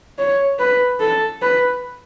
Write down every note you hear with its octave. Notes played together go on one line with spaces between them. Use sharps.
C#5
B4
A4
B4